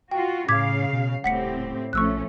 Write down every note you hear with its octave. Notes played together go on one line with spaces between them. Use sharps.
F4 F#4 G5
A2 C#3 F5 D6 G#6 B6
B2
D#1 A2 C4 G4 F#5 B6 C#7
A#1 F3 A3 C#4 C#6 E6 F#6